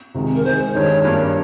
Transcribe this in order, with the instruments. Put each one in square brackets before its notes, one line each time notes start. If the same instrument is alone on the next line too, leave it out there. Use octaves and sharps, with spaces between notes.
[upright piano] C2 C3 D#3 G#3
[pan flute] A#4
[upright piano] D#3 G#3 D#4 G#4 [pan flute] C5
[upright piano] G2 D#3 G#3 D#4 G#4 [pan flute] C#5
[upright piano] G2 G3 A#3